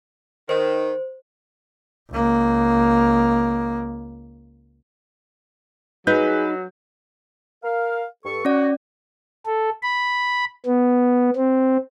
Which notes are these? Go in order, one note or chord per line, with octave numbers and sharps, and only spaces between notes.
D#3 C5
C#2 A#3
F#3 D#4 G#4 B4 G6
A#4 F5
G2 A4 C#6
C#4 F#4 D5
A4
B5
B3
C4